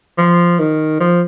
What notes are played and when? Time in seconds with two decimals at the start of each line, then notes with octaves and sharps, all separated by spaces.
0.18 F3
0.59 D#3
1.00 F3